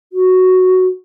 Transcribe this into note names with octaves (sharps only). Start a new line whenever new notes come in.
F#4